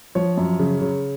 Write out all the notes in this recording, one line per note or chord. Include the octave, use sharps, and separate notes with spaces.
F3 C#5
F#2
C#3
C#3